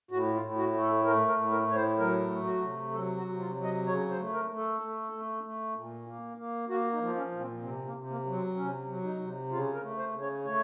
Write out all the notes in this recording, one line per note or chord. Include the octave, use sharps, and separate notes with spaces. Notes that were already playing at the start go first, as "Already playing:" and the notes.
A2 F#4
F4
A2
F#4
A3
A4
A3 A#4
A#4
A2
A#4
A2 C#5
C5
F#3 A#4
A3
F#4
C3
F#3 A4
F#4
C3
F4
F#3
D#5
C#3 C#5
C5
A3
A#4
A3
A4
A3
A3
A3
A#2
A#3
A#3
A#3 F#4
D#4
F3
C#4
A#2
C4
C3 C4
A#3
C3
A#3
F#3
C4
C3 C#4
F#3
D#4
C3
C#3 F4
A#4
A3
C5
C#3
C#5
A3 C#5